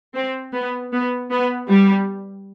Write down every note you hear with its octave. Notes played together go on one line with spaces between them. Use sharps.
C4
B3
B3
B3
G3